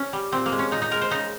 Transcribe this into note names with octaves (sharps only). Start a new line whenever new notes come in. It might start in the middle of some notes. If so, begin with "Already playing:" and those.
Already playing: C#4
G3
A#2 C4
A#3
G#3
C#4
A#2 D#4
D#4
G#3 A#4
C5
C#3 D#4